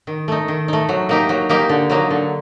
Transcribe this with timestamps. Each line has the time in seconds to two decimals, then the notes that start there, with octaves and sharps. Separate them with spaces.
0.07 D#3
0.28 A3 D#4
0.48 D#3
0.68 A3 D#4
0.89 F#3
1.09 A#3 D#4 G4
1.29 F#3
1.49 A#3 D#4 G4
1.69 D3
1.90 F#3 A#3 D#4
2.10 D3